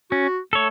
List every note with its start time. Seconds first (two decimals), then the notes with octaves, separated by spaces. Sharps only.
0.11 C#4 F#4
0.52 A3 A4 C#5